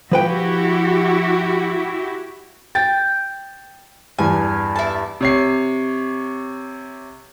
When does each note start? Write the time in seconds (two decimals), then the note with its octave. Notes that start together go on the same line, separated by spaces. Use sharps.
0.12 F3 E4 F#4 G4 B4 G5
2.75 G5 A6
4.19 E2 G2 G#5
4.76 E4 A5
5.21 C3 C#5 C7